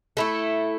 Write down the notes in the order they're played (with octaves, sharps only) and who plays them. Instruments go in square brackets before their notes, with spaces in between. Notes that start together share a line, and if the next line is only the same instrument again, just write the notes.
[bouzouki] A3 E4 A4